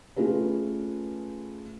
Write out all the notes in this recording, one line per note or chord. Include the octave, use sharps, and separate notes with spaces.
A3 C#4 F4 G#4 B4